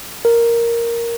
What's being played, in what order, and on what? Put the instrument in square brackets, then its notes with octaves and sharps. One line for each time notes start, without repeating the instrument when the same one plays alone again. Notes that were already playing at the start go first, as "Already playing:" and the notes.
[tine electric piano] A#4